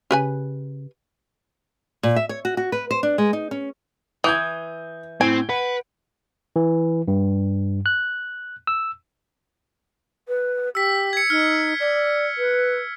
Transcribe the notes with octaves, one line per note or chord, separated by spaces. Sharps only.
C#3 G4 B4 G#5
A#2
E5
C#5
F#4
F#4
B4
C5
D4
G#3
D#4
C#4
E3 D#6 G6 G#6
A2 C4 G#5 D7
B4 F#5
E3
G2
F#6
E6
B4
G4 E6 B6
G#6 C#7
D#4 F6
D5
B4